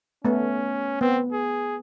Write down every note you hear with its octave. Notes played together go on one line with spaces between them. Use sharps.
A3 B3 C#4
B3 C4
G#4